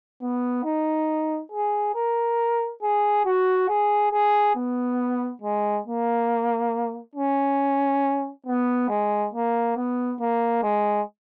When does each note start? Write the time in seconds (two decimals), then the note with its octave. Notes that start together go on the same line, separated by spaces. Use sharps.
0.22 B3
0.64 D#4
1.52 G#4
1.95 A#4
2.83 G#4
3.26 F#4
3.69 G#4
4.12 G#4
4.56 B3
5.42 G#3
5.86 A#3
7.15 C#4
8.46 B3
8.89 G#3
9.33 A#3
9.76 B3
10.20 A#3
10.63 G#3